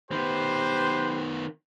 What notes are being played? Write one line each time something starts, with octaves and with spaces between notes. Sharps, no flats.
D#3 B3 G4 B4 C5